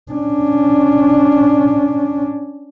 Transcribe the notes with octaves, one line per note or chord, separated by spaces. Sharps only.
C#4 D4